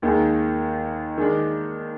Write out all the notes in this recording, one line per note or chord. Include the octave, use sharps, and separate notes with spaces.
D#2 D#3 G#3 D#4
D#3 G#3 D4